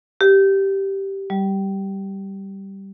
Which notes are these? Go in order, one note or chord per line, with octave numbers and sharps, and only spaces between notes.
G4
G3